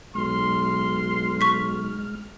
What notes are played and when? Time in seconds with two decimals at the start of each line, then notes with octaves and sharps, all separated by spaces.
0.15 B1 G#3 C6 F6
1.41 C#6 B6